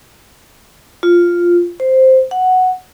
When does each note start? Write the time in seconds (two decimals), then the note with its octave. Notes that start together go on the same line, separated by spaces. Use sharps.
1.03 F4
1.80 C5
2.31 F#5